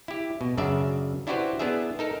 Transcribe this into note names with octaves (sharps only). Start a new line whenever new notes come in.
E4 G4
B2
F#2 C#3 D4 D5 E5
D4 E4 F#4 G4 B4 C5
B3 D4 E4 G#4 E5
D#4 A4 A#4